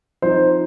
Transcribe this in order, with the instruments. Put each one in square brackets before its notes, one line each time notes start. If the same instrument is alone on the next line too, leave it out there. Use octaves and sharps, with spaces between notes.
[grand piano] F3 C4 D#4 C5